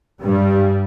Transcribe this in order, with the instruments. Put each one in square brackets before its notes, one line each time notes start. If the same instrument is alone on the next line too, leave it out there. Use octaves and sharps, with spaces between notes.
[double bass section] G2 G3